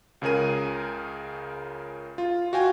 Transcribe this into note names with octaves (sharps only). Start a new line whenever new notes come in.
C#2 C#3 G#4 A#4 D#7
F4
F#4 F5 G5 G#5